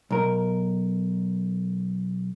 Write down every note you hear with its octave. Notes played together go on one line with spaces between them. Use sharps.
B1 A#4